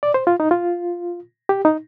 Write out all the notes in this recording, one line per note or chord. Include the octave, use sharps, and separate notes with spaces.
D5
C5
F4
D#4
F4
G4
D#4